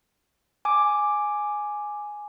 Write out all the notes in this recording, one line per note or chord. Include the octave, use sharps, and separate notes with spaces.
G#5 D6